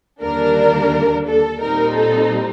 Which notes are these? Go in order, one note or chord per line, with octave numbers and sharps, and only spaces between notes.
D#2 D3 G3 A#3 D4 A#4
A4
A#2 G3 C4 D#4 A#4
A4